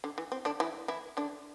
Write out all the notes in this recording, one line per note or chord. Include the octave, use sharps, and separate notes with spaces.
D3
E3
C4
D3 D4
E3 E4
E3 E4
D3 D4